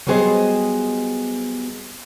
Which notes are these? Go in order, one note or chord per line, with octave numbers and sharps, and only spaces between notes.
F#3 G3 B3 G#4 C5 D#5